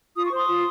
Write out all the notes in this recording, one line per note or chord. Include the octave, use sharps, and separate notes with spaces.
F4 D#6
C#6
C5 C6 D#6
F4